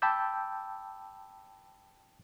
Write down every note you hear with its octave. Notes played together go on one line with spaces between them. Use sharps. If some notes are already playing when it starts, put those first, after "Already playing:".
G5 A5 B5 D6 E6 G6